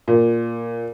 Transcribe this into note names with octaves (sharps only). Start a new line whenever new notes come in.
A#2